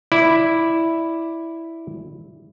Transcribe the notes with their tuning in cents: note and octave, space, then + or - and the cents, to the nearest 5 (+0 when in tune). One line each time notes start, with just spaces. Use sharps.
E4 +0 D5 +0